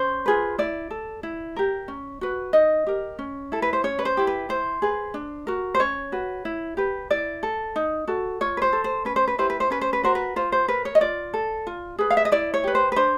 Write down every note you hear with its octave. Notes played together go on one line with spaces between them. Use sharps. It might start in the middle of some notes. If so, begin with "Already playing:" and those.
Already playing: C#4 C5
F4 G#4 B4
E4 D5
A4
E4
G4 A#4
C#4
F#4 B4
D#4 D#5
G4 A#4
C#4
E4 A4
B4
C5
C#4 C#5
B4
C5
E4 G4
B4
E4 C5
G#4 B4
D4
F#4 A#4
C5
C#4 C#5
F#4 B4
E4
G4 B4
E4 D5
A4
D#4
F#4 A4
F4 C#5
B4
C5
A4
C5
C#4 B4
C5
B4
E4 G4 B4 C5
B4
C5
C#4 B4
C5
B4
F#4 A#4 C5
B4
F4 C5
C5
A#4 B4
C#5
D#5
F4 D5
A4
F4
G#4 B4
F5
E5
D#5
E4 D5
C#5
G4 B4
C5
B4
D4 C5